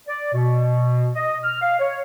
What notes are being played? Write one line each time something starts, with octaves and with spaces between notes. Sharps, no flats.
D5
B2
D#5
F6
F5
C#5